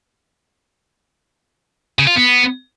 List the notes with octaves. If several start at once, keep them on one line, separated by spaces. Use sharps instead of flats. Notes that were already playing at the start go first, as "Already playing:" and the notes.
C#3
F4
B3